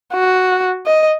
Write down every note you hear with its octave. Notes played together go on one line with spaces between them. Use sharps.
F#4
D#5